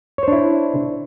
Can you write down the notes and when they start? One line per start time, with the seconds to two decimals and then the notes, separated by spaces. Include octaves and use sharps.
0.18 C#5
0.23 C5
0.28 D4
0.32 E4